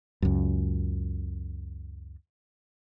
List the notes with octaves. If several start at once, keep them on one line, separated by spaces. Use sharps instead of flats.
C#2 F#2